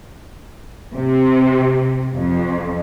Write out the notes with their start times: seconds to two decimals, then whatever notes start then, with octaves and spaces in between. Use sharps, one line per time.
0.97 C3
2.17 F2